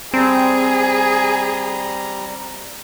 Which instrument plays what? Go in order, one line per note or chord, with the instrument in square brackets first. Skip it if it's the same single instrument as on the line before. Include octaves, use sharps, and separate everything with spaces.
[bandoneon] G3 A#5 [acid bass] C4 [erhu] G#4